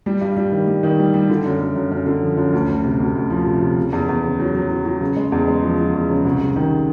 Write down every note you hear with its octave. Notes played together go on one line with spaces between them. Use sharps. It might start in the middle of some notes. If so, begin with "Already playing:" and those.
G3
G2
G3
D#3
G3
D#3
G3
G3
D3
F#2
D3
F#2
F#2
D3
F3
F#2
D2
D2
C3
D2
D2
F3
C3
C3
C#3
E2
E2
C#3
F#3
F#3
F#3
F#3
C#3
G#3
E2
G#3
F3
F3
E2
C#3
C2
C3
D#3